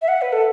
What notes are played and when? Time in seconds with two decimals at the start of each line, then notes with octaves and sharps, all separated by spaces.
0.02 E5
0.08 F#5
0.22 B4
0.33 A4